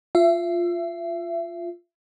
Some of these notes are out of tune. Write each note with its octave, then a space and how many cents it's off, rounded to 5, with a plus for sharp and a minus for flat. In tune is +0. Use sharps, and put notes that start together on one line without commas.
F4 +0 E5 +30